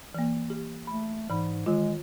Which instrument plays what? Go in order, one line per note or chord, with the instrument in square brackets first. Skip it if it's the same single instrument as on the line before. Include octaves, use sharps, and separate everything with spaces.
[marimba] E3 A#3
G4
[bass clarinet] A3 [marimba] B5
[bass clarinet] G#2 [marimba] E3 B5
[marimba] D#3 F4 [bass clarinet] G#3